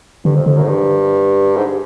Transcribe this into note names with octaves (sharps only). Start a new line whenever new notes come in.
G2 D3
F2
F2 D3
F#2
G#2
G2
G#2